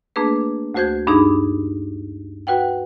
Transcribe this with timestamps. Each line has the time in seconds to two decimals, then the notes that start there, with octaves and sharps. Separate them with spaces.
0.16 A3 A#3 D4 G#4 B4
0.74 D2 A3 F#4 C5 G6 G#6
1.07 G2 D4 D#4 G#4 B5 D6
2.47 F#4 B4 F#5 G5